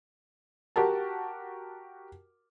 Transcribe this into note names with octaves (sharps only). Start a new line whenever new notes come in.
F#4 G4 A#4 A5